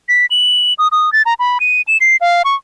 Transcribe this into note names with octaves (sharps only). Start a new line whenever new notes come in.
B6
F#7
D#6
D#6
A6
A#5
B5
D#7
E7
C7
F5
C#6